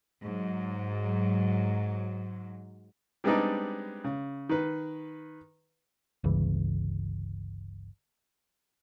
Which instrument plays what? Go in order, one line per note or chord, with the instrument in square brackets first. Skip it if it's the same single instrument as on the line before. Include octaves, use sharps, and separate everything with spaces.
[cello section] G#2 F#3
[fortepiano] G3 G#3 B3 C4 D4 D#4
C#3
D#3 B4
[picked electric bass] G1 C#2 C#3 E3